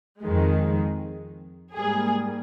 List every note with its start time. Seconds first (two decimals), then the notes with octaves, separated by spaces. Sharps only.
0.21 F2 D#3 G#3
1.75 G#2 G3 A#3 G#4